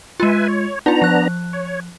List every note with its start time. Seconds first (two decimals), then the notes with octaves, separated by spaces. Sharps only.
0.20 G#3 F4 B4 E5 G#5
0.48 C#5
0.86 B3 D4 D#4 F4 A#5
1.02 F3 F#6
1.53 C#5